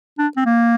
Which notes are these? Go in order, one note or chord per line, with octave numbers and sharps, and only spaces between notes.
D4
C4
A#3